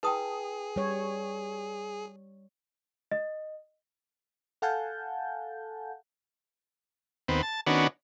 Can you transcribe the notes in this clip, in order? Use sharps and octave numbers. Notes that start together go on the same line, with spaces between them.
E4 G#4 B4 G5 A5 D#6
G3 C#5
D#5
A4 F5 F#5 G#5 A5 G6
D#2 B3 C4
A5
D#3 B3 C#4 D4 F#4